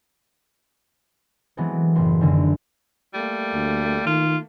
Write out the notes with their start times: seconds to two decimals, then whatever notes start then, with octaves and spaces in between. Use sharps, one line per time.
1.57 E3 F#3 G#3 B3 C4 A4
1.95 F#1 A2 B3 F#4 B4 C6
2.21 F#2 D3 D#3
3.14 G3 A3 A#3
3.54 D2
4.06 D#3 F4